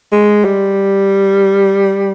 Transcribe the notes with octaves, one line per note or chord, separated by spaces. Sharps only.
G#3
G3